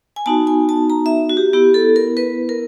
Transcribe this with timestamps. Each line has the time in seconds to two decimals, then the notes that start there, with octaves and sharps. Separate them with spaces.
0.16 G#5
0.26 B3 D#4 F#4 A5
0.47 G#5
0.69 A5
0.90 A#5
1.06 E5
1.29 F#4
1.37 G4
1.53 B3 E4 G4
1.74 A4
1.96 A#4
2.17 B4
2.49 A#4